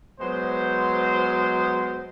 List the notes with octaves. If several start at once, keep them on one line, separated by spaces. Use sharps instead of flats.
F#3 G#3 B3 C5